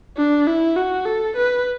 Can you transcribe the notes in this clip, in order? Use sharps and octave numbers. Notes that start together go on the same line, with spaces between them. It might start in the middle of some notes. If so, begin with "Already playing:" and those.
D4
E4
F#4
A4
B4